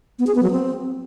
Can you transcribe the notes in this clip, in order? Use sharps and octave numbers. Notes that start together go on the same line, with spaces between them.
B3
G#4
B3
F#3
C4